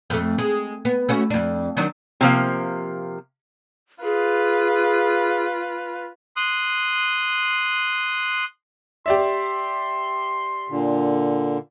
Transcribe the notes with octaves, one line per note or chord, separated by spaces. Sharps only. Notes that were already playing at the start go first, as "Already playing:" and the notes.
F2 A3
G#3
B3
A3 C#4 F#4
F2 D4
D#3 F#3 D4
C3 F3 A#3
F4 G#4 B4
C6 D#6 F#6
G4 D5 E5 C6
A#2 D3